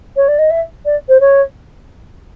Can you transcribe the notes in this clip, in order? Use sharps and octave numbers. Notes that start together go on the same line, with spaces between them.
C#5
D5
D#5
E5
D5
C5
C#5